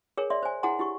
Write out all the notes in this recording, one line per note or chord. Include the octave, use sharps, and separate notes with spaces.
G#4 A#4 C#5 G#5
D5 E5 C6
C5 G#5
E4 G#4 F#5 G#5 A#5 C6
E4 G4 C#6